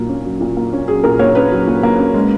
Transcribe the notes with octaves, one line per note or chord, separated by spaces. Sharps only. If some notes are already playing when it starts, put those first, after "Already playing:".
Already playing: A#2 F#3 A#3
C#4
F#3
A#2
A#3
C#4
F#3 G#4
A#2 A#4
A#3 C#5
C#4 B4
F#3
A#2
A#3
C#4
G#3